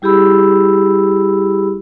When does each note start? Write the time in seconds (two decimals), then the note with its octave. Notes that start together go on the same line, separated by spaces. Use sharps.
0.02 G3 E4 G4 G#4 B5 E6